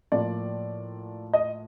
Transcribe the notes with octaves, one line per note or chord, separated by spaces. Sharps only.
A2 F3 A#3 D5
D#5